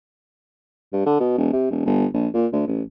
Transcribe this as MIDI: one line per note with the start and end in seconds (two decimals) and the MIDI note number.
0.93 1.02 43
1.06 1.19 50
1.20 1.33 47
1.38 1.51 28
1.53 1.66 48
1.71 1.81 28
1.86 2.06 31
2.14 2.28 34
2.34 2.47 46
2.53 2.63 38
2.67 2.82 33